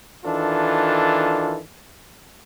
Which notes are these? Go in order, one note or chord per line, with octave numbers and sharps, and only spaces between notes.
D#3 E3 D4 F4 A4